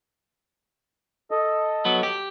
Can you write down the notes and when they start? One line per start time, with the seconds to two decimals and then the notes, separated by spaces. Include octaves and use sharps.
1.31 A4 D#5
1.85 F#3 B3
2.03 G4